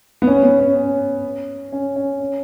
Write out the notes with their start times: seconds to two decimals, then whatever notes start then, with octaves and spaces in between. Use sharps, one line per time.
0.22 B3
0.27 C#4
0.43 B3
0.60 C#4
0.76 C#4
1.72 C#4
1.96 C#4
2.20 C#4